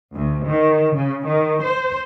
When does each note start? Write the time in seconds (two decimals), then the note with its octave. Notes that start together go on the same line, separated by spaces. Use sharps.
0.13 D2
0.47 D#3
0.97 C#3
1.26 D#3
1.63 C5